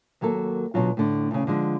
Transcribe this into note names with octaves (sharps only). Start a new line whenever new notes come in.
D#2 F#3 A#3 A4
B2 D3 F#3 F4
A2 D3
D2 C#3
D3 F3 G#3